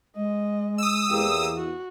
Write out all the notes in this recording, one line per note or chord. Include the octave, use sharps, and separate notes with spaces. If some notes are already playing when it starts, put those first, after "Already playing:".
G#3 D#5
D#6 E6
E2 A#3 G4
F#4